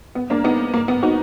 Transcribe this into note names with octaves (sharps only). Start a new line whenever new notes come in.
B3
A#3 D4
B3 D#4
A#3
B3
D#4 F#4